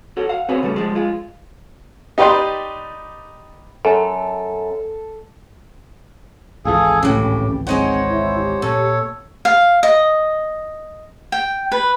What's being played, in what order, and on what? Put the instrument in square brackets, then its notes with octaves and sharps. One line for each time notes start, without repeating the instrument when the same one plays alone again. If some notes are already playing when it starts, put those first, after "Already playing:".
[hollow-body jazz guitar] F#4 A4 C#5
F5 F#5
C4 F#4 G#4 B4 C#5
C#3 G3 A3 C#4
F3 G3 G#3
G#3 F4
[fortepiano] D#4 G4 B4 D5 G5 C6
[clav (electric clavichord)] F#2 [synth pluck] A4
[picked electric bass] G#1 C#2 E3 [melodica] G#4 A4 G#5 [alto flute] F5
[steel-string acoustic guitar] A2 C#3 [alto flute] C#4 [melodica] G4
[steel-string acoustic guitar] G#3 D#4 F#5 [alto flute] C4 [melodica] C5 C#5
[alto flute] E4
G4
[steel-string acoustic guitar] A#2 [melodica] A4 C#5
[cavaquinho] F5
D#5
G5
B4